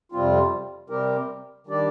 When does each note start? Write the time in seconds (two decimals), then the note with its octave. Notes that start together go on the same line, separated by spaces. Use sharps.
0.12 F2 C3 G3 C4 F4
0.90 C3 G3 C4 G4 A#4
1.67 D#3 G3 D4 G4 D5